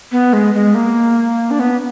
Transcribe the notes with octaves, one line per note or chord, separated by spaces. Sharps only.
B3
G#3
G#3
A#3
D4
B3